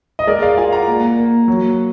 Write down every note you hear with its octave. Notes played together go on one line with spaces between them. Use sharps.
D#5
G#3 A#4 D5
D5 F5
F4 F5 G#5
F#5 A#5
A#3
A#3
F#3